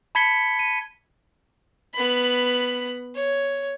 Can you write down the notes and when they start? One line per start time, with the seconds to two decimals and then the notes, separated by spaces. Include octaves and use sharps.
0.15 A5 B5 G#6 B6 C#7 G7
0.59 D#7
1.94 B3 B5
3.15 C#5